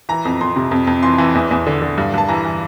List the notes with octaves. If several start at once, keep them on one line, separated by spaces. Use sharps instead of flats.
E3 A#5
F2
F2 C6
C3
F2
F2
E3 C6
E3
E2
E2
D3
D3
G2
G2 A5
E3 A#5
E3